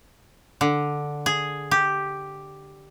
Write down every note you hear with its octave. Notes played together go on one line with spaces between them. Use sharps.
D3
G#4
G4